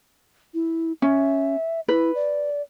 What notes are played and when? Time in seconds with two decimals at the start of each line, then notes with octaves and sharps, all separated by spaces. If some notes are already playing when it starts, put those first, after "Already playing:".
0.54 E4
1.02 C#4 E5
1.88 E4 B4
2.15 D5